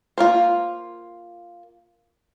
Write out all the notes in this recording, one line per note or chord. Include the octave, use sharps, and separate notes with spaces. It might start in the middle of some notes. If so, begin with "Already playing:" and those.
A#3 F4 A#4 C5